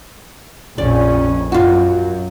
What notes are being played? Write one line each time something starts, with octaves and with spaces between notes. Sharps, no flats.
A#1 F2 C#4 D5
F#2 F4 F#4